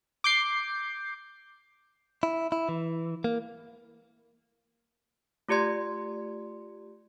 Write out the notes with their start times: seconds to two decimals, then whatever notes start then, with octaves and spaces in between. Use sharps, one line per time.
0.24 D6 G6 C7
2.23 E4
2.52 E4
2.69 E3
3.24 A#3
5.48 A3 F4 G4 D5 C6 G#6